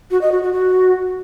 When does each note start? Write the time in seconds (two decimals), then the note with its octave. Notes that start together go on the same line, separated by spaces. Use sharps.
0.11 F#4
0.21 D#5
0.32 F#4
0.42 F#4
0.53 F#4